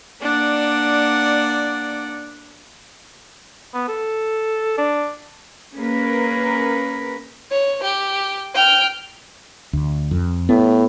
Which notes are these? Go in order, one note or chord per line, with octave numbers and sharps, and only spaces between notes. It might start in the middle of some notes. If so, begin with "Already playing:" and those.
A#3 D4 D5 F#5
B3
A4
D4
A#3 C#4 G#4 A#4 B4
C#5
G4
G5 F6
D2
F2
A2 B3